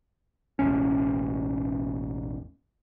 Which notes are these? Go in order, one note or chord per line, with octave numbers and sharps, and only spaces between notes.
E1 A1 C#4